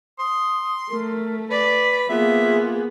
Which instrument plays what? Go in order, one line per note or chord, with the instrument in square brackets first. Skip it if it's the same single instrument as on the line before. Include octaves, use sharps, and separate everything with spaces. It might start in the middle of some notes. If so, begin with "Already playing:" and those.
[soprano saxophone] C6 [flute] D#6
[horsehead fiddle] A3 [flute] A#4
[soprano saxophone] B4 [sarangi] D5 [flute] B6
[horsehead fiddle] A#3 G#4 [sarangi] B3 [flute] F4 [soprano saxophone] E5